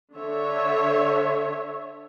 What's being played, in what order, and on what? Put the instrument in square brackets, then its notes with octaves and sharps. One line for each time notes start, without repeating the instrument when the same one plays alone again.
[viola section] D3 C#5 E5